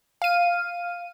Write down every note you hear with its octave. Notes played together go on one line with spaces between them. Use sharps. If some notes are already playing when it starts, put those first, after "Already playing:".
F5 D#7